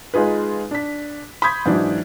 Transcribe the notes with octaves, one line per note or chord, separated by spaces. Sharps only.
G#3 D#4 F4 G#4 B4
D4 B6
B5 C6 D#6 G6 G#6 B6
G#2 E3 F#3 D4